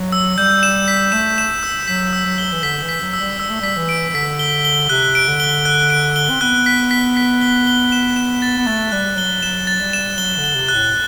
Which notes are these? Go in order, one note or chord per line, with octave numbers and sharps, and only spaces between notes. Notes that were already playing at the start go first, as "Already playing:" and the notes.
Already playing: F#3
E6
G3 G6
E7
B6
A3 E7
E7
E6
F#3 B6
E6
F#3
G7
E3
D3 B6
E3
B6
F#3
E6
G3
G3 E6
A3
G3 B6
E3
D7
E3
D3 B6
G7
G7
C3 F#6
D7
D3
G7
F#6
D7
G7
C4
B3 F#6
B6
B6
B6
G7
G7
E7
E7
A6
B3
A3 A6
G3 F#6
F#3 G7
F#3 E7
A6
G3
E7
F#3 G7
D3
G7
C3
F#6
A2